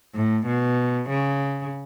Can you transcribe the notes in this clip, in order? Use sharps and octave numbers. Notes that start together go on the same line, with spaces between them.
A2
B2
C#3